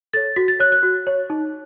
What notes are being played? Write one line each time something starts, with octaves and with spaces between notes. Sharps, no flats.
A4 C#5 A6
F#4 B6
A6
C#5 F#6
F#6
F#4
C#5
D#4